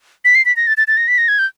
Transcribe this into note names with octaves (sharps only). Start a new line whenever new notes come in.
B6
C7
B6
A#6
A6
A6
A6
A#6
B6
A#6
G#6
G6